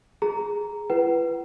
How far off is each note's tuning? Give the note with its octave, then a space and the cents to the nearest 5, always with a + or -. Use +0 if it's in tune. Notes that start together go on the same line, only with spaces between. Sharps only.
G#4 +0 A#5 +0
F4 -45 B4 +0 F#5 +45